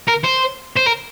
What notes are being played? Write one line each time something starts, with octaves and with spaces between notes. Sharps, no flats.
A#4
C5
C5
A#4